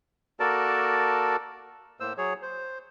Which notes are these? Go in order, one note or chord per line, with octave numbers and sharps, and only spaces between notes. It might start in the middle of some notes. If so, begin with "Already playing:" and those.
A#3 F#4 A4 A#4 D5 A5
A2 A#3 C5 E6
F#3 G#4 C#5
C5